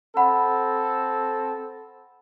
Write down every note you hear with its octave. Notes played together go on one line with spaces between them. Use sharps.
C4 A4 F#5 B5